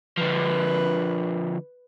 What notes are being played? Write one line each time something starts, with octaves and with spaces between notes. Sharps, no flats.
D3 F3 B4